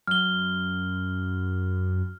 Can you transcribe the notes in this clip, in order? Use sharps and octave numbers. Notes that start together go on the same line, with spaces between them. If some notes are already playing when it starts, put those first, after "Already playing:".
F#2 F6 G7